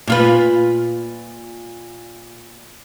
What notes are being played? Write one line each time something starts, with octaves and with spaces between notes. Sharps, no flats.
A#2 F4 B4